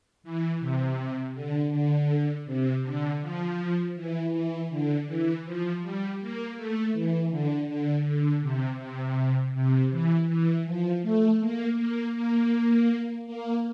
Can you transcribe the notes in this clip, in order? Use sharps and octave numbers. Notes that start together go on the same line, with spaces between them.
E3
C3
D3
D3
C3
D3
F3
E3
E3
D3
E3
F3
G3
A#3
A3
E3
D3
D3
D3
C3
C3
C3
E3
E3
F3
A3
A#3
A#3
A#3
A#3